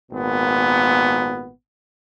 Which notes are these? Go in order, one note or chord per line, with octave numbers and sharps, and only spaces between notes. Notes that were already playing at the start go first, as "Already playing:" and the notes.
G#1 A#2 B3